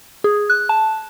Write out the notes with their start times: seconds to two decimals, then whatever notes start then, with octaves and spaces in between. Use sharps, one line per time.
0.24 G#4
0.50 F#6
0.69 A5